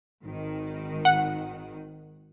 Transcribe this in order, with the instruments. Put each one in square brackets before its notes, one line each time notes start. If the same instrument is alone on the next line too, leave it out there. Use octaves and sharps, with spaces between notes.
[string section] G#1 D#3
[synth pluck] F#5